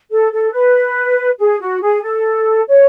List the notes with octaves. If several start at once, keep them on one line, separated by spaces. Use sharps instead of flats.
A4
A4
B4
G#4
F#4
G#4
A4
C#5